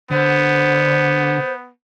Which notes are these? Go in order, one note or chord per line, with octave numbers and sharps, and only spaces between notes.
D3 B3 C5